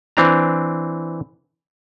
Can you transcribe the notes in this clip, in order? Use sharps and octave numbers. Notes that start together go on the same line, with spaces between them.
E3 C4 D4 A#5